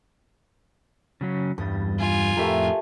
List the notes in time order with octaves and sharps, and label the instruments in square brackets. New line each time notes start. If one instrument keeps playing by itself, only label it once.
[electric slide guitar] C#3 F#3 C#4
[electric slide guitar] E2 G2 G3 [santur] D#6
[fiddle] F4 G#5
[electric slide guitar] F2 A2 E5 [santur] A3 G4 A#4